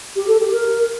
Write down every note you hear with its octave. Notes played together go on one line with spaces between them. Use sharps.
G4
A4
G4
A#4